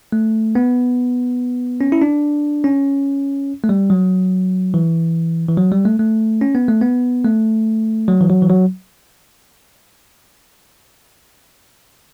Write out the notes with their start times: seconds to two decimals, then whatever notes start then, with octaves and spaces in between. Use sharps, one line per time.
0.12 A3
0.55 B3
1.81 C#4
1.92 E4
2.02 D4
2.64 C#4
3.64 A3
3.69 G3
3.90 F#3
4.74 E3
5.49 E3
5.57 F#3
5.72 G3
5.85 A3
5.99 A3
6.41 C#4
6.55 B3
6.68 A3
6.82 B3
7.25 A3
8.08 F#3
8.21 E3
8.30 F#3
8.42 E3
8.50 F#3